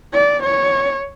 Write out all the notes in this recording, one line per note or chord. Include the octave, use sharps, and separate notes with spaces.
D5
C#5